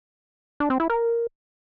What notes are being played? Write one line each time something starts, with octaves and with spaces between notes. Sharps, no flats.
D4
C4
E4
A#4